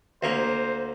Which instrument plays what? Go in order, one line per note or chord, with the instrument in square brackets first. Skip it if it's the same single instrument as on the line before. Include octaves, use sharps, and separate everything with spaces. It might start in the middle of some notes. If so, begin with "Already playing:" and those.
[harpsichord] D2 A#3 C#5 [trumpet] C5